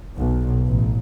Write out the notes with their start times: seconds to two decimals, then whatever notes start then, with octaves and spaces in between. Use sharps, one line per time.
0.17 B1
0.68 A1